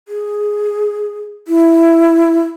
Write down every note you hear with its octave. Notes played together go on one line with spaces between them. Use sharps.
G#4
E4